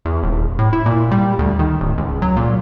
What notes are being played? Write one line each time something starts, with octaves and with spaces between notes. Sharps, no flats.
E2
D#1
A2
E4
A#2
G3
D2
D#3
D1
C#2
F#3
A#2